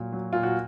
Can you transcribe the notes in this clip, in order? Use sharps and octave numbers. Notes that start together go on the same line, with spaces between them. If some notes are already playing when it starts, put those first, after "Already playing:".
Already playing: A#2 F#3
F#3
A#2 F4
F#4